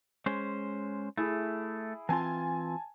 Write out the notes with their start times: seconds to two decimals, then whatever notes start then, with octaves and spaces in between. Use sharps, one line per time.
0.26 G#3 C#4 C5
1.17 A3 E4 G#4
2.09 E3 C4 F4 G#5 A5